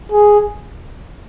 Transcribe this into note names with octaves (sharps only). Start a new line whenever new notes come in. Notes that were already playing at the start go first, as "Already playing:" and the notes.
G#4